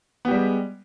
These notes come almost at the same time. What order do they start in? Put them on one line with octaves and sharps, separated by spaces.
B3 G4 G3 G#3